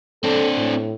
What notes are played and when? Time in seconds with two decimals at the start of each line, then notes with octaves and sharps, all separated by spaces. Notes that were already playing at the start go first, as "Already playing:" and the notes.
0.24 C4 D4 A4
0.58 A2